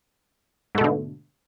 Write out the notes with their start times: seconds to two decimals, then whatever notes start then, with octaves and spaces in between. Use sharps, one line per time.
0.75 G#2
0.78 A3
0.81 B2
0.84 D3